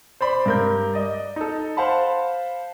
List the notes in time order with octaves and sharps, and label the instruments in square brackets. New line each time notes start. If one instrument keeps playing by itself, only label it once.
[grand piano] C5 D5 B5
G2 A#4 G6
D5 D#5
D#4 A4
C5 F5 F#5 A5 B5